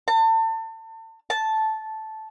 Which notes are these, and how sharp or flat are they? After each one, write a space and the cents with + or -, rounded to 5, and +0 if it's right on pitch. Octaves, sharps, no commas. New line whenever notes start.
A5 +35
A5 -5